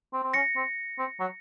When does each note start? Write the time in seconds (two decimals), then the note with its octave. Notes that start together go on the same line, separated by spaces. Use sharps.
0.13 C4
0.23 C4
0.34 C#4 A#6 C#7
0.56 C4
0.99 C4
1.20 F#3